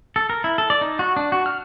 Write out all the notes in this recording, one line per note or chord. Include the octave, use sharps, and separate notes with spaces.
A4
A#4
E4
A4
D5
D#4
F#4
D4
F#4
F6